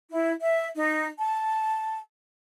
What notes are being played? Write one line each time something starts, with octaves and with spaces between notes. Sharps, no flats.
E4
E5
D#4
A5